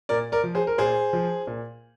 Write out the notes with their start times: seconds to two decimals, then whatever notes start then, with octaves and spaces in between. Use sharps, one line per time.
0.09 A#2 A#4 D5
0.32 A#4 D5
0.43 F3
0.55 G#4 C5
0.67 A#4
0.78 A#2 G#4 C5
1.13 F3
1.47 A#2